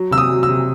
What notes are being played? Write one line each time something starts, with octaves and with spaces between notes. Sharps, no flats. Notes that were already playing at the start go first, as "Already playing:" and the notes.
Already playing: F#3
C3 E6
D#6
F#3
E6
C3